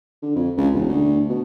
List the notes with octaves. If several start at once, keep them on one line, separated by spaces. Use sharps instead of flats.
D3
F2
C#2
E1
D2
B2